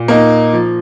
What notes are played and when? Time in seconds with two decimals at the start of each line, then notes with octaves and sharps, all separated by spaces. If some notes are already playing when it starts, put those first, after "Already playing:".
Already playing: A#2
0.08 A#3 D#4
0.53 F3